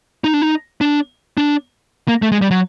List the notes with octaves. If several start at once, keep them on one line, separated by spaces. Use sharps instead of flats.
D#4
D4
D#4
D4
D4
A#3
A3
G#3
G3
F#3